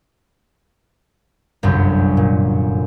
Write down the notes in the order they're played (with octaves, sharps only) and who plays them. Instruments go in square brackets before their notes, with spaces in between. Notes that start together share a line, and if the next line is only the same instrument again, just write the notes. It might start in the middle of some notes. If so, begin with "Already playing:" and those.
[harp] G1 C2 F#2
A#2